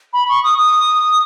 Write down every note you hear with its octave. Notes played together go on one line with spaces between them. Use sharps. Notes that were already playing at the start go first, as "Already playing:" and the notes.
B5
C#6
D#6
D#6